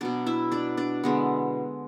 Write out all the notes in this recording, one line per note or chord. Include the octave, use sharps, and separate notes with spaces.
B2 F#3 B3 D4 D5
E4 E5
D4 D5
D4 D5
D3 G#3 B3